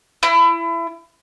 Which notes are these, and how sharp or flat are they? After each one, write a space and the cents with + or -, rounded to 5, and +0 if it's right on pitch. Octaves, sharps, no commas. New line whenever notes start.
E4 +25